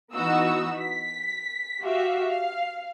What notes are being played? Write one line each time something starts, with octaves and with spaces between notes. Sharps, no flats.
E3 B3 D#4 F#4 E6
B6
F#4 G4 E5 F5
F5